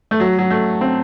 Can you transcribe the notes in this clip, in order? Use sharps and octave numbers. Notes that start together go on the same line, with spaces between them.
A3
F#3
F#3
A3
C4